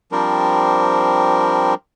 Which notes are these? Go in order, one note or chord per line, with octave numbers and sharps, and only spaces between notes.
F3 G3 C4 D4 A#4